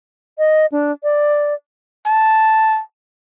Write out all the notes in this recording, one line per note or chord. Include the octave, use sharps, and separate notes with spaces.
D#5
D4
D5
A5